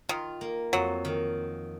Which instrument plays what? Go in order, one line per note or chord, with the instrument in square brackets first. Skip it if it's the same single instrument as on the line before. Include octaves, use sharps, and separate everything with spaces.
[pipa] D#3 [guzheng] F4
[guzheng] A#3
[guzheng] F2 [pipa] F#3
[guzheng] D#3